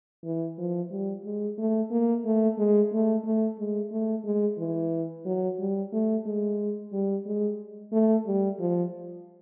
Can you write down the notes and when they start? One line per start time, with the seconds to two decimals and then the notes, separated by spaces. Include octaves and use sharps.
0.24 E3
0.58 F3
0.91 G3
1.25 G#3
1.58 A3
1.91 A#3
2.25 A3
2.58 G#3
2.92 A3
3.25 A3
3.59 G#3
3.92 A3
4.25 G#3
4.59 E3
5.25 F#3
5.59 G3
5.93 A3
6.26 G#3
6.93 G3
7.26 G#3
7.92 A3
8.26 G3
8.60 F3